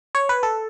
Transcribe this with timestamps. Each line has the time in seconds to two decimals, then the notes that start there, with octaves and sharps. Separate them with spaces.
0.15 C#5
0.29 B4
0.43 A4